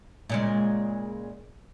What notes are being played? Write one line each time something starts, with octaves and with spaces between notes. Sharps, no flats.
A#2 C#3 G#3